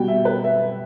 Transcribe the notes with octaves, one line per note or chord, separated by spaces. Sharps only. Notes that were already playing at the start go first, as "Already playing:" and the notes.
Already playing: B2 G3 G5
E5
B4
E5